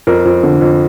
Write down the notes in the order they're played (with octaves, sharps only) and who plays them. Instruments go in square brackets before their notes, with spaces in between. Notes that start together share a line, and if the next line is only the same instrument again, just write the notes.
[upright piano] F2 A#4
F2
D3
F2